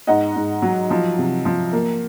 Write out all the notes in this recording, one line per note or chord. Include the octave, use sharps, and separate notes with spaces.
G#2 D#5 F#5
G#2
F#3
F3
C3
F3
A#3